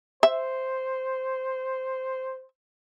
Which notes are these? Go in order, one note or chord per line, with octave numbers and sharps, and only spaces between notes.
C5 E5